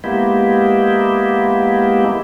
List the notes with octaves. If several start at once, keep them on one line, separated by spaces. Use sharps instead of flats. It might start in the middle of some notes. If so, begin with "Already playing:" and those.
G#3 A#3 B3 E4 G4